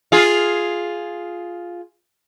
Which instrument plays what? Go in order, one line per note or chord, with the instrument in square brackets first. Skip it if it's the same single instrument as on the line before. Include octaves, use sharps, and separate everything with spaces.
[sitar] F4 G#4